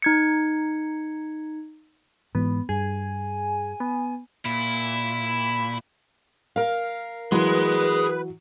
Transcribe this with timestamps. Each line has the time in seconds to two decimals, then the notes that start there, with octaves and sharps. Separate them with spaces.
0.02 D#4 G#6 C#7
2.35 G#2 E3 G#3 B3
2.69 G2 G#4 G#5
3.80 B3
4.45 A#2 E4 B5
6.56 A#4 F5
7.32 E3 F#3 G#4 B4 C6